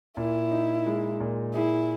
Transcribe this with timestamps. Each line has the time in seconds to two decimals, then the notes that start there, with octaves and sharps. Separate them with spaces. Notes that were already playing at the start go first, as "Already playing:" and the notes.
0.17 A#2 E4
0.51 D#4
0.86 G#3
1.20 A#2
1.54 E4 G#4